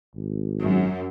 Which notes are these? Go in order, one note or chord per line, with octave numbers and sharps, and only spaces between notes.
G#1
F#2